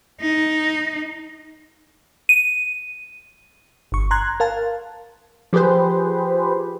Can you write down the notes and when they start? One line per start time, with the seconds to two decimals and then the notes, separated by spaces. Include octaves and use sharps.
0.21 D#4
2.29 D#7
3.92 G1 C#6
4.11 A#5 C6 F#6 G#6
4.40 A#4 F5 A5
5.53 F3 G4 G#4 B4 C5